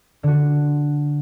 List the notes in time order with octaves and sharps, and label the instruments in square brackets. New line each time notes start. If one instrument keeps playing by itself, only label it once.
[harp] D3 F#4